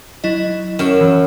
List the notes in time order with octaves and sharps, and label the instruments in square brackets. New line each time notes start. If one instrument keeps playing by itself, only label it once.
[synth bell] F#3 E4 D#5
[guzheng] F#2 [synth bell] C#6 F6 E7
[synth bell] E3